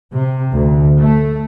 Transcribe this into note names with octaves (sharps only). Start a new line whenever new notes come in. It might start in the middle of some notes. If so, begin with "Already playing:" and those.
C3
D2
A3